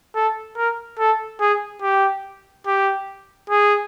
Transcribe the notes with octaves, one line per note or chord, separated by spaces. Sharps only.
A4
A#4
A4
G#4
G4
G4
G#4